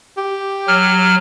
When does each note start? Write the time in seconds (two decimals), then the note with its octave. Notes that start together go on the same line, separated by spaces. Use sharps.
0.17 G4
0.68 F#3 F6